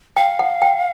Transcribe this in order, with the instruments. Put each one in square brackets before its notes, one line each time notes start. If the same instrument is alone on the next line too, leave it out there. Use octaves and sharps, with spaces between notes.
[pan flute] F5 [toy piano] G5
[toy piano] F#5
G5